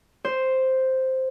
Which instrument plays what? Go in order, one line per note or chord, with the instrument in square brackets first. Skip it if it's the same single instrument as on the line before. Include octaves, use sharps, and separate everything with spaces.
[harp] C5